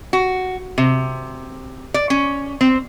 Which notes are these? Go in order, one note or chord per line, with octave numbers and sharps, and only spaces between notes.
F#4
C3
D5
C#4
C4